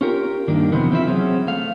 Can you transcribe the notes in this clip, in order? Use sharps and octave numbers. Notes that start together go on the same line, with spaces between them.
C#4 F4 G4 A#4
G2 D#3 A#3 D4
F2 C3 D#3 E3 B3
E3 C4 E4 F4 E5
F#3 C4 C#4 G#4
A3 F5